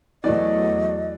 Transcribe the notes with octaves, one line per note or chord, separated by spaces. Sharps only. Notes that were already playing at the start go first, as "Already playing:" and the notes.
E2 E3 F#3 A3 D5 D#5